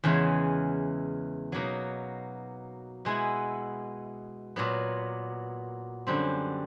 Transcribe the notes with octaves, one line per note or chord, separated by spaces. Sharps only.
E2 C#3 E3 G#3
B2 F#3 A#3 D#4
B2 G#3 B3 E4
A#2 F#3 B3
F#2 D3 G3 C4